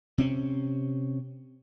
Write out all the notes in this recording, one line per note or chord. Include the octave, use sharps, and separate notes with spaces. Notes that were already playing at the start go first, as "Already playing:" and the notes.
C3 C4 C#4